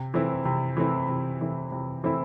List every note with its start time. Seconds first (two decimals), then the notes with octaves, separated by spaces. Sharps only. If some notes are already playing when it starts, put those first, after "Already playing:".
Already playing: C3
0.14 E3 A3 C4 E4
0.45 C3
0.77 E3 A3 C4 E4
1.09 C3
1.41 E3 A3 C4 E4
1.72 C3
2.04 E3 A3 C4 E4